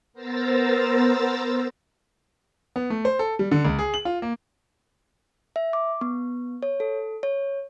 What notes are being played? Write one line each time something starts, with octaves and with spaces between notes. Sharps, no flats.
B3 A#4 C5 A#5 E6 A6
B3
A3
C5
A4
G3
D3
C#2
G#4
F#7
F4
A#3
E5
D6
B3
C#5
A4
C#5